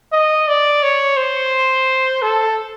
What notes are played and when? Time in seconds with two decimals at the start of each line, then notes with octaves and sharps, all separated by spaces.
0.13 D#5
0.48 D5
0.83 C#5
1.17 C5
2.22 A4